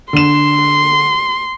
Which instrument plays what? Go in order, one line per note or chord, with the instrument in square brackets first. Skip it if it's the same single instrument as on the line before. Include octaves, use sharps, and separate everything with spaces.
[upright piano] D3 E7 [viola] C6